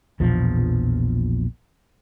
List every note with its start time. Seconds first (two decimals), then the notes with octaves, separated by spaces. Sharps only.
0.20 A#1 E2 B2 F3